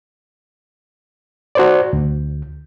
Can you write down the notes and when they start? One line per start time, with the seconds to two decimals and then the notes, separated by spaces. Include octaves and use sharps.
1.55 F#4 C5 D5
1.93 D2